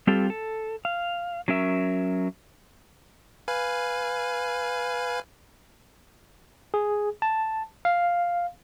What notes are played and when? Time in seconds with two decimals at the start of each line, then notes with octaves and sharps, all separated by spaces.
0.07 G3 C4 F4 G4 A4
0.30 A4
0.85 F5
1.48 F#3 C#4 A#4 E5
3.48 B4 F5 G#5
6.74 G#4
7.22 A5
7.85 F5